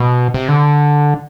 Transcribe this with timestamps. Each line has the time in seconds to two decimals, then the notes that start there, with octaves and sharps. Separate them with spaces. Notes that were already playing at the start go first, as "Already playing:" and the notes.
Already playing: B2
0.34 C3
0.49 D3